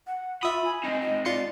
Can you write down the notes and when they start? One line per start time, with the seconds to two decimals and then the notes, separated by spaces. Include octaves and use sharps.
0.07 F#5
0.43 F4 E5 B5 D#6
0.65 G#5
0.84 C4 D#4 D#5
1.01 D#5
1.25 F4 D5 C6 C#7